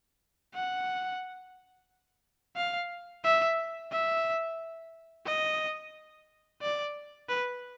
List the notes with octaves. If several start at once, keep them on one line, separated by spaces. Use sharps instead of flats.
F#5
F5
E5
E5
D#5
D5
B4